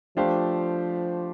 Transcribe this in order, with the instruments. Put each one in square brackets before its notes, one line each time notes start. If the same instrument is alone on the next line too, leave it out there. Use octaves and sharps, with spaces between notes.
[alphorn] F3 [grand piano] A3 D4 G4 C5 F5